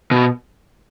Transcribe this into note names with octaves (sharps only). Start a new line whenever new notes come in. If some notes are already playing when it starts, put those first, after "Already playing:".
B2